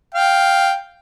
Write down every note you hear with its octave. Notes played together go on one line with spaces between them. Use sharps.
F5 G5